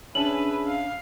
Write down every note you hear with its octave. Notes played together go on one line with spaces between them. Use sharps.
C#4 D4 G#4 B4 E5 A5 F#7
F5